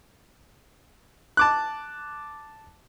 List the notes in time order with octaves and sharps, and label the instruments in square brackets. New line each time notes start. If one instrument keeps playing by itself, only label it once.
[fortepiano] A5 D6 F#6